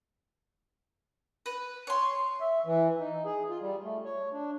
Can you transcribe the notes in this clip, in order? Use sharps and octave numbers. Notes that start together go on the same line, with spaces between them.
B4
C#5 C6
E5
E3
D#4
G#4
F4
G3
A3
C#5
D4